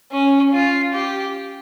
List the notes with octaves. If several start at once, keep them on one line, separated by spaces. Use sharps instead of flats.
C#4
F4
G4